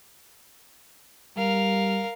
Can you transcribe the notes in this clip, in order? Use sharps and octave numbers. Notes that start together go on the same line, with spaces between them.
G3 A#4 F5